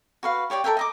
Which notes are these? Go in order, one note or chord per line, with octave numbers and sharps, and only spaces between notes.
F#4 B4 F5
G4 C#5 D5 G5
A4 A#4 E5 G5
D#5 A#5 D6